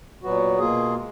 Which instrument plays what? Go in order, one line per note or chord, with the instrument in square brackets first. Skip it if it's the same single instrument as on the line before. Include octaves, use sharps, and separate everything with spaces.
[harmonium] A#2 F#3 B3 F#4
B2 A#3 F4 G#4
G#3